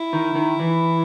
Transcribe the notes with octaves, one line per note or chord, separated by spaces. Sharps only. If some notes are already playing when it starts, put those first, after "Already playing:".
Already playing: E4
D#3
D#3
E3